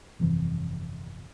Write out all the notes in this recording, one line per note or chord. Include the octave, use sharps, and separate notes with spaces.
G1 F2 C3 E3